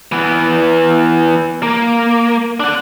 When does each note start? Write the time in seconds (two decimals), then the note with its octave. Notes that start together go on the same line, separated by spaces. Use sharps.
0.12 E3 B3
1.63 A#3
2.60 D4 F#5